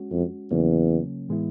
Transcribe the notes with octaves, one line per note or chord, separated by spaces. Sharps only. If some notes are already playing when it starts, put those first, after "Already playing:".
Already playing: G#3 C#4 F#4
F2
E2 C#3 F#3 A#3 C#4
A2 E3 G#3 B3 E4